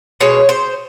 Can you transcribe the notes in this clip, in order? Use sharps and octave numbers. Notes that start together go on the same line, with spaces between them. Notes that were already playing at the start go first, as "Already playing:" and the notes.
B2 G#3 C#5
C5